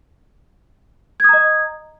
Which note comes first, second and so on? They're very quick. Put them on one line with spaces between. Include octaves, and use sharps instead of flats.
G#6 D#6 A#5 D#5